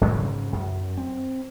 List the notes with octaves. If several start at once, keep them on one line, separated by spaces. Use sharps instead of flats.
G#2 C#3 F#3 G#3
F#2
C4